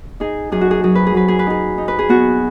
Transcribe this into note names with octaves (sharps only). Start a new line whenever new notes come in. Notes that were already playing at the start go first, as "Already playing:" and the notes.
D#4 G#4
F#2 G#4
F#4
G#4
F#3 G#4
B4
G#4
F#3 B4
G#4
B4
D#4 G#4
D#4
B4
G#4
B3 F#4